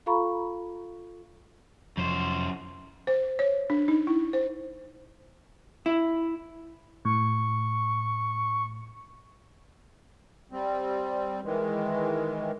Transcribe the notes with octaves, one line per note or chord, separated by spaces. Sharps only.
F4 A4 F5 A#5 B5 C#6
F1 F#2 F3 C5
C5
C#5
D4
D#4
E4
C5
E4
A2 C#6
G3 C4
D#3 E3 G#3